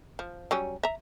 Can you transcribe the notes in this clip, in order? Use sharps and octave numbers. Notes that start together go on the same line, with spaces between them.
F3
F#3 G3 C#4
E5 A#5